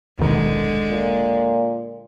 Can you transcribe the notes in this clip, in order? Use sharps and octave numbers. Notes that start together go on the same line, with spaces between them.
D#1 B1 D3 D#3 G#3
A#2